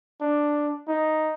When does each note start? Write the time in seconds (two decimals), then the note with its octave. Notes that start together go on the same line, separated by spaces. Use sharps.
0.21 D4
0.88 D#4